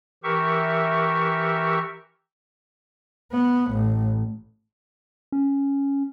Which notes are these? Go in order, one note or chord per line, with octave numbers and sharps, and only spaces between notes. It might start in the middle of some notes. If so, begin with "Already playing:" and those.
E3 G4 A#4 E5 C#6
B3
A1
C#4